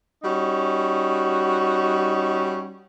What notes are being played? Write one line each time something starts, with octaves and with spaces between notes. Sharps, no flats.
G3 C#4 D#4 F#4